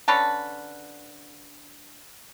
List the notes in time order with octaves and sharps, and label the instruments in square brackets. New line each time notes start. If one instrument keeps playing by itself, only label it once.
[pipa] D3 C#4 B4 A5